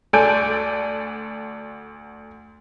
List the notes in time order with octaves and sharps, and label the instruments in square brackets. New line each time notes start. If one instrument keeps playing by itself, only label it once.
[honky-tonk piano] D2 A4 D5 G#5 G6 D7